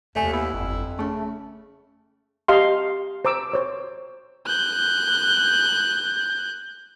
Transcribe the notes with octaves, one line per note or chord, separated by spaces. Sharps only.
F1 D#2 A3 D5 G#5
B3 E4
G1 F2
C#3 A3 C#4 G#4
G4 D#5 F5 A5 C6
C5 A#5 D6 E6
C5 C#5 E6
F#6 G6